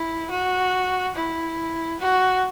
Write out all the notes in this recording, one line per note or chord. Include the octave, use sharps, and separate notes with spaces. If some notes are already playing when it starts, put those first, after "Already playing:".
Already playing: E4
F#4
E4
F#4